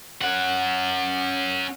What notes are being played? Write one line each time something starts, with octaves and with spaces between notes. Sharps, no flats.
C#4 F#5